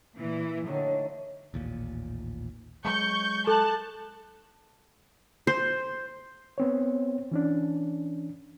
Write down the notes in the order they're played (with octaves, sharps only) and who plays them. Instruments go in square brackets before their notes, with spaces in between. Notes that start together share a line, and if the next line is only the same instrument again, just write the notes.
[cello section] A#2 E3
[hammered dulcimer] A2 D#3 F#3 [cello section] D3
[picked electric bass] A1 D#2 A#2
[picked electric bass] F#3 G#3 [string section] C#6 G6
[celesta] A4 [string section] A5 F#6
[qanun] C5
[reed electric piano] B3 C4 C#5
E3 C#4 D4